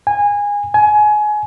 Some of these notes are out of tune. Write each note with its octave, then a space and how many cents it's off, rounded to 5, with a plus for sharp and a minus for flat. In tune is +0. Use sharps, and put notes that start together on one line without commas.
G#5 -20
G#5 +25